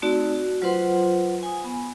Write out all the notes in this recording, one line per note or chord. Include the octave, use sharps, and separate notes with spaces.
A3 C4 D#4 F#4 D5
F#4
F#3 F4 B4 C5 F#5 C6
G#5 D#6
B3